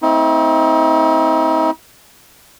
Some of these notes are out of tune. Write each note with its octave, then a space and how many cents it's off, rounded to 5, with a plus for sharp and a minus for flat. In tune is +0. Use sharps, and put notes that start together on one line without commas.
A3 +25 C4 +0 D#4 +40